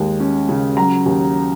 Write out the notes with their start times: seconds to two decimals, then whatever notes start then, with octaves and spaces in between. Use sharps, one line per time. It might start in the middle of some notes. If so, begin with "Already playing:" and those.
Already playing: D#2 G#3
0.20 C#4
0.49 C#3
0.77 F#3 A#5
1.06 D#2